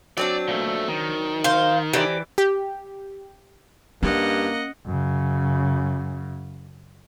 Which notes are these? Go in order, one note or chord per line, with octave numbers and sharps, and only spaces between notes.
F#3 C4 D4 D5
A#2 A3
D#3
C5 F5
E3 G4 C5 D5
G4
G2 A#3 C#4 D#5 F#5
F#2 C#3